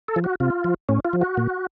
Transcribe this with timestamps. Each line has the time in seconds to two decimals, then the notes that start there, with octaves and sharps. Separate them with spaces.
0.08 A4
0.16 F3
0.24 F#4
0.40 C3 F4
0.64 F3
0.89 A2 C#4
1.05 F4
1.13 F3
1.21 F#4
1.37 A#2